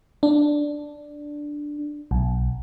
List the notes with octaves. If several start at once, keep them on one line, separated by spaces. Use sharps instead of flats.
D4
B1